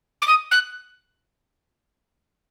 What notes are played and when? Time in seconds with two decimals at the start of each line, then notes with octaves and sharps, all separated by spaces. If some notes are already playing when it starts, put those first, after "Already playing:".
0.22 D6
0.28 D#6
0.51 F#6